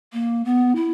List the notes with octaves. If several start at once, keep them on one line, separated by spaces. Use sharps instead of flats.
A#3
B3
E4